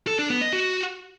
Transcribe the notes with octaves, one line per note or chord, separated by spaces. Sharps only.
A4
D4
B3
D#5
F#4